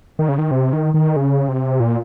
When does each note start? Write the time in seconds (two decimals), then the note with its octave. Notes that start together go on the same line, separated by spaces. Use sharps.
0.19 D#3
0.29 C#3
0.38 D#3
0.51 C3
0.73 D#3
0.94 D#3
1.16 C#3
1.48 C3
1.80 A#2